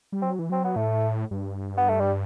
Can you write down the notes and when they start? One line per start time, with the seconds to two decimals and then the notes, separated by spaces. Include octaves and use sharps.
0.12 G3
0.22 F#3 C4
0.39 E3
0.50 F#3 C4
0.65 B3
0.76 A2 A3
1.31 G2
1.77 B3
1.89 A3
2.00 G3